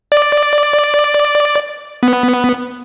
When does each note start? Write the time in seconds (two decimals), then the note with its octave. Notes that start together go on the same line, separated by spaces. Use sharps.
0.12 D5
2.03 B3